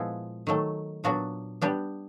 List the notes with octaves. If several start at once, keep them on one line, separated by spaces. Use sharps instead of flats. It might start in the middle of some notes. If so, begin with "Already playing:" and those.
Already playing: A#2 F3 G#3 B3 E4
D#3 F#3 A3
A#2 F#3 B3 D4 F#4
G3 B3 D4 G4